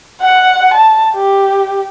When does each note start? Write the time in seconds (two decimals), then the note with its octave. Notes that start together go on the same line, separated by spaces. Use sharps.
0.21 F#5
0.74 A5
1.14 G4